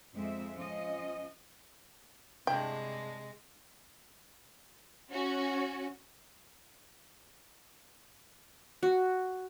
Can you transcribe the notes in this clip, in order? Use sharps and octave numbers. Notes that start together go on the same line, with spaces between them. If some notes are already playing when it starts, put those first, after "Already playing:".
F2 G#3 C4 E5
F3 C#4 D#5
G2 C3 G#3 D4 E4 G5
C#4 F#4
F#4